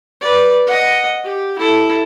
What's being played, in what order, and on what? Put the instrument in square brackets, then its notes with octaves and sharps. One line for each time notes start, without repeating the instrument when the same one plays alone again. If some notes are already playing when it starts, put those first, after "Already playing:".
[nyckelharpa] B4 D5
D#5 F#5
G4
E4 A4